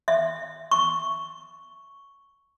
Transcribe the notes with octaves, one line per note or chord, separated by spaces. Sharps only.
E5
C#6